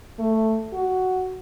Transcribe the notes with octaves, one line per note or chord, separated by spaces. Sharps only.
A3
F#4